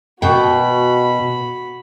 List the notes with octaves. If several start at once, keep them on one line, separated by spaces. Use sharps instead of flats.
B2 F#4 G5 B5